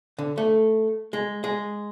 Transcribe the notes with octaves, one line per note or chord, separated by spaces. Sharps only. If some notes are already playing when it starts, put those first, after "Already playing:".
D3
A3
G#3
G#3